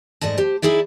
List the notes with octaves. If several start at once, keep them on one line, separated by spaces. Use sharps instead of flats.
G#2 A3 D5 D#5 A5
G4 C5
D#4 E4 G#4 D5 E5